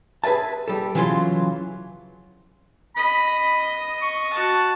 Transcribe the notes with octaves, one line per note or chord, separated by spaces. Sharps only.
G#4 B4 D#5 E5 A5
G3 A4
C#3 E3 F#3 F4 G#5 C6
D#5 B5
C#6
F#4 A5